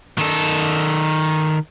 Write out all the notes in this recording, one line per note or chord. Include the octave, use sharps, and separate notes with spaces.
D#3 A4